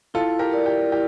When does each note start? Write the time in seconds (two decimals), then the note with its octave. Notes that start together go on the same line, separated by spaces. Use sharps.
0.14 E4 F4 A4
0.39 G4 A#4
0.52 A#4 D5
0.66 G4
0.92 E4 G4